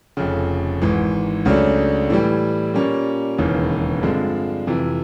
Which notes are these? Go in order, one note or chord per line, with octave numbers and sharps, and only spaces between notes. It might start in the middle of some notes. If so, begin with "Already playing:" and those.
F1 F2 C#3
G#1 G#2 E3
C#2 C#3 F#3 A3 D4
A2 E3 G3
A#2 G3 A#3 C#4
E1 D#2 C#3 E3
G2 D3 F3 G#3 C4
F2 C3 E3